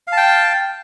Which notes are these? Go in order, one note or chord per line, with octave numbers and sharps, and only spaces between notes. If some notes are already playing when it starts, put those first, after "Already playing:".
F5 G5 A5